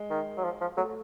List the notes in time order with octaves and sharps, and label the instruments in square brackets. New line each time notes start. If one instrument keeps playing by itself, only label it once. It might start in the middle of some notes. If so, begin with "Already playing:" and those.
Already playing: [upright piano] G#3
[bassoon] D#3
F#3
F3
F3
[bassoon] F#3 [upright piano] A3